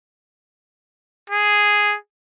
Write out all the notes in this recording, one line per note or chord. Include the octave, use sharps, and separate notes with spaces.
G#4